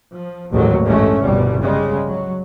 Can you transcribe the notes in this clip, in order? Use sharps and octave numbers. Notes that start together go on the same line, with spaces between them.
F3
A1 D#2 G#2 F#3
A1 G2 G#3 A3 C#4
G1 C2 B2 G3
C#3 G3 G#3
F#3